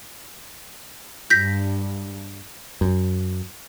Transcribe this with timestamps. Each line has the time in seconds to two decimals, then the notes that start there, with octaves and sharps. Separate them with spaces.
1.30 G2 G6 A#6 B6
2.81 F#2